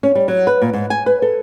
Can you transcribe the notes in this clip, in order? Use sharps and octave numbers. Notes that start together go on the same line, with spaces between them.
C#4
G3
F#3
B4
A#2
G#2
G#5
B4
A4